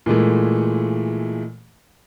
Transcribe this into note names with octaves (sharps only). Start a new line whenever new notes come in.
A#2 E3 G#3 A3